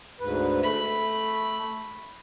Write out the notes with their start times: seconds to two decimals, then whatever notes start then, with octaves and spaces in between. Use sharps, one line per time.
0.20 D2 G#2 B4
0.63 A3 B5